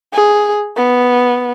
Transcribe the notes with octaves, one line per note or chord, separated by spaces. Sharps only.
G#4
B3